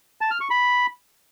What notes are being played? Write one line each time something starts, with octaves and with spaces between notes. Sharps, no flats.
A5
F6
C#6
B5